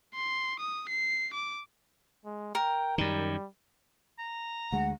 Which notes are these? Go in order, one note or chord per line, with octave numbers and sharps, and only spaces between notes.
C6
D#6
C7
D6
G#3
A#4 G5
F#2 D#3 G3
A#5
D2 G#3 F#5